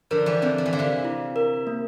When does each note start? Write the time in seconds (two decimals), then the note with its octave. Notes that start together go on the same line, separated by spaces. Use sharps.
0.11 D3 F3 A#4
0.26 E3 G3
0.42 D3 F3 C4
0.58 F3
0.66 E3
0.73 D3 F5
0.79 C3 E3
1.04 E4
1.36 A#4
1.67 A#3